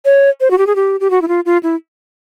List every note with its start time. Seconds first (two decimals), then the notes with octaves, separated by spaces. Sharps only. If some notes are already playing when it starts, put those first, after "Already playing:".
0.05 C#5
0.41 C5
0.51 F#4
0.58 G4
0.67 G#4
0.76 G4
1.00 G4
1.11 F#4
1.22 E4
1.28 F4
1.46 F4
1.63 E4